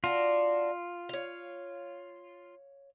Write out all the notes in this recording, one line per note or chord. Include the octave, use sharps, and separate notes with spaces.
D4 F4 F#4
C#5 F5